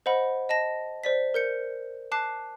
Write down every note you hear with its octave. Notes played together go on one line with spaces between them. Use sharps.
C5 D#5 F#5 B5
D#5 A5 A#6
C5 D5 B6
A#4 G6 C#7
A5 D6 F#6 C7